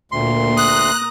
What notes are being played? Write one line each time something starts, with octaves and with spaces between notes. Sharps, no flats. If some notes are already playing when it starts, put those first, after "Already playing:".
D2 A#2 A#3 C6
A#5 D#6 F#6